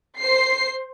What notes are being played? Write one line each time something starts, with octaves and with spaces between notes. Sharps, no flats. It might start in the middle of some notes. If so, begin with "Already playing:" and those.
C5 C7